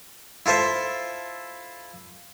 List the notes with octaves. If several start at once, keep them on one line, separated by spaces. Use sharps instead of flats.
E4 F4 A4 C5 E5